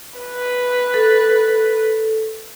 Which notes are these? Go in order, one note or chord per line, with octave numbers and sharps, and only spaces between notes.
B4
A4